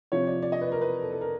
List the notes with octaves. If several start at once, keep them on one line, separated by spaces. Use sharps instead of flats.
C3 F3 C#5
D5
D5
D#5
B4
A#4
B4
A4
A4
A#4